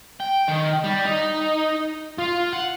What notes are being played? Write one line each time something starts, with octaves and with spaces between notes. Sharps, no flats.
G5
D#3
G3
D#4
F4
F#5